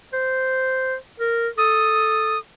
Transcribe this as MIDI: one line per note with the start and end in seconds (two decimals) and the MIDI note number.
0.13 0.95 72
1.20 1.48 70
1.58 2.37 69
1.58 2.38 87